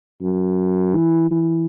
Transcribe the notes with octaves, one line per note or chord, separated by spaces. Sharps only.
F#2
E3
E3